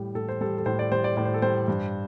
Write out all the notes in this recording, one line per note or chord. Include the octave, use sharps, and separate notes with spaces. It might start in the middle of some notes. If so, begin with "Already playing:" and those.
Already playing: A2 G3
A2 A4
C5
G3 A4
A4
A2 C5
D5
G3 C5
D5
A2 D5
C5
A4
G3 C5
G2